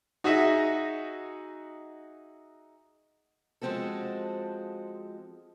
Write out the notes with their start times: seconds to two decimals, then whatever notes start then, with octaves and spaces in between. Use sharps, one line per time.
0.24 D#4 F#4 G#4 D#5 E5
3.61 F3 G#3 C4 F#4 A4